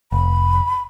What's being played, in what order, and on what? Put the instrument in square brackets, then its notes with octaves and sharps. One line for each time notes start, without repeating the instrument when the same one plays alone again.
[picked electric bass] F1 [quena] B5